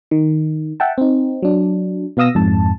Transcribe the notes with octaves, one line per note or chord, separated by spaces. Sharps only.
D#3
E5 F#5 G5 A5
C4 D#4
F#3 D4
B2 B3 F5 D#6 E6 A#6
F2 G#2 A5